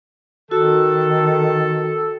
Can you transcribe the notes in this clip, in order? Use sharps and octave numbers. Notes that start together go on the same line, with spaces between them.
D#3 F#4 A4